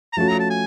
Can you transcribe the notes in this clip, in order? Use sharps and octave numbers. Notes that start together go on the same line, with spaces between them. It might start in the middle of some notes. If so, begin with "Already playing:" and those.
A#5
F3 A3 C#4 F#4 A5
A#5
A5
G#5